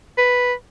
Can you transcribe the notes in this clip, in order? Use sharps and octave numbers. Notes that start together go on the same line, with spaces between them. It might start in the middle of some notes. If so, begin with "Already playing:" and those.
B4